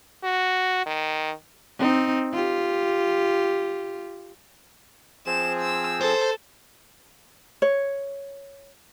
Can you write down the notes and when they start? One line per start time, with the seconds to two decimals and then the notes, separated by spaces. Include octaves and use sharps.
0.24 F#4
0.86 D#3
1.79 C4 D#4
2.33 F4 G4
5.26 F3 C4 G#4 E7
5.60 E6
6.01 A4 C5
7.62 C#5